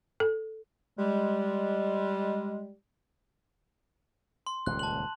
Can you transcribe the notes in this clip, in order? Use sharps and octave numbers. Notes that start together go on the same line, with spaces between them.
A4
G3 G#3
C6
D#1 C#2 A#2 F#6
A5 F#7